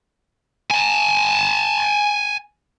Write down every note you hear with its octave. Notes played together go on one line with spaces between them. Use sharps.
G#5 A5